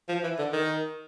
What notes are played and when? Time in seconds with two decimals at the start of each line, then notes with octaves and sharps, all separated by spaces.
0.09 F3
0.23 E3
0.38 D3
0.53 D#3